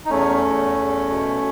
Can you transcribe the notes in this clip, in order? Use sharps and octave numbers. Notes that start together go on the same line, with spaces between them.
D#4
E2 A3 C#4
E2
E2
B2